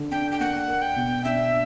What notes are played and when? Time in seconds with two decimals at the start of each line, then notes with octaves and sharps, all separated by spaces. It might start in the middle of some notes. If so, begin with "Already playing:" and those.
Already playing: D3 D4
0.11 D4 G5
0.31 G5
0.40 A#3 F#5
0.68 A#4
0.82 G5
0.96 B2
1.24 D4 E5